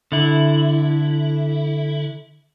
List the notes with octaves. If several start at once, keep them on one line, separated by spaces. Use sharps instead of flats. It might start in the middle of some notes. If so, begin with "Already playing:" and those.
D3 E4